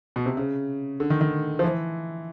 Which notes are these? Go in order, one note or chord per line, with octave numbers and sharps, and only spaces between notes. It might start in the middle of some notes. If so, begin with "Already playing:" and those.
B2
C3
C#3
D3
D#3
D#3
F3
E3